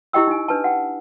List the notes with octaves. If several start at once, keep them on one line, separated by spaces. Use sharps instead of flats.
E4 G4 D#5 G5 E6
D#4 G#5
D4 B4 G#5 A5
F#5 G5